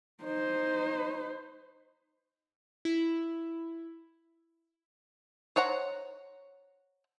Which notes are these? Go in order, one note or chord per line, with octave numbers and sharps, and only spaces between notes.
D#4 C5
E4
C5 C#5 F#5 A#5